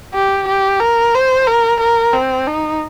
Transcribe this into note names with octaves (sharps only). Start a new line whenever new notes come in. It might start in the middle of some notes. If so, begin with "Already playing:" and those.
G4
G4
A#4
C5
A#4
A#4
C4
D#4